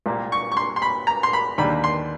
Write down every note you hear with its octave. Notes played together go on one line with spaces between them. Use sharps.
C2 A#2 G3 A#3
C#6
C#6
C6
C6
B5
A#5
C6
B5
D#2 D3 G3 A#3 B5
C6